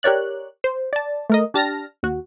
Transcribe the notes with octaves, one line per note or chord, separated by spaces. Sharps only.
G4 A#4 C#5 D5 F#6
C5
D5 A5
A3 A#4 D#5
D4 G4 A5 F6 A#6
D#2 F#4